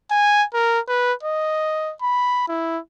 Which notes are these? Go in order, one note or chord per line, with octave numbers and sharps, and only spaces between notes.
G#5
A#4
B4
D#5
B5
E4